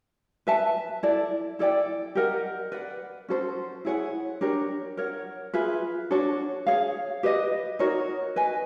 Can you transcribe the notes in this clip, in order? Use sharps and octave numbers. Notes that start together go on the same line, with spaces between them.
B4 E5 A5
E4 A4 D5
E4 A4 D5 G5
G4 A#4 D#5 F#5
B4 D5 F#5
C#4 F#4 A4 C5
E4 G#4 C#5 F#5
D4 G4 A#4 C#5
A#4 C#5 F#5
F4 G#4 B4 E5
D4 F#4 A4 C#5
G#4 C#5 F5
G4 B4 D#5
D#4 F#4 A#4 C#5
B4 D#5 G#5